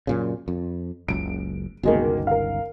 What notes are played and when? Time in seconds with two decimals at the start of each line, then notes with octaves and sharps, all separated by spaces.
0.07 F#2 A#2 C#3
0.48 F2
1.08 F#1 C#2 D7
1.83 G1 C#2 B2 D#3 G#3 A#3
2.27 A#4 F5